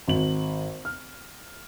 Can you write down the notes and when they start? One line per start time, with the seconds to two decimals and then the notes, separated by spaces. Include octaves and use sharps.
0.08 G#1 F#7
0.85 F6